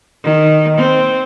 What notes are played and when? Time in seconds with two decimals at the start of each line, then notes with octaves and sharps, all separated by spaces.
0.24 D#3
0.78 C4